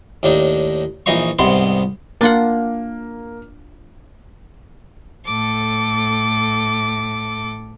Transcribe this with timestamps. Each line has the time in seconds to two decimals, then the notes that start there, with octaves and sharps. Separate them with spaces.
0.23 D#2 A2 D4 D#4
1.06 A#1 E3 D#4 D#5 F5 C#6
1.39 C2 G#2 C3 B3 B5 C6
2.21 A#3 D4 F4 F#5
5.27 A2 A4 D6